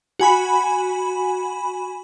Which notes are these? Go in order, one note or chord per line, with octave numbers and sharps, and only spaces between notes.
F#4 G#5 B5